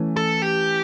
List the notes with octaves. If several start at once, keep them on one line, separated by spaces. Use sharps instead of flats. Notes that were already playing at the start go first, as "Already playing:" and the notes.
Already playing: E3 A3 C#4
A4
G4